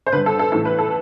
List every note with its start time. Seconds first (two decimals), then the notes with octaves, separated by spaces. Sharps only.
0.06 C5
0.13 G2 D3 B4
0.26 A4
0.39 A4
0.52 A2 E3 A4
0.65 B4
0.78 A4